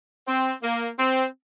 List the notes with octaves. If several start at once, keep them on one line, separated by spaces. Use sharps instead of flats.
C4
A#3
C4